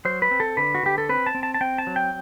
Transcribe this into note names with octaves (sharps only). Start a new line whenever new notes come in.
F#3 C5
B4
C4
A4
D3 B4
F#4
D3 G4
A4
C4 B4
A5
C4
A5
A5
C4 G5
A5
F#3
G5